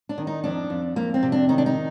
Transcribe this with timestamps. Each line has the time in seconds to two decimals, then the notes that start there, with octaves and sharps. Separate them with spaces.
0.09 D4
0.18 D#3
0.27 D#4
0.44 F2 D4
0.70 F2
0.96 F2 A#3
1.14 C4
1.23 C3
1.32 D4
1.49 D#3 D#4
1.58 D4
1.66 D#4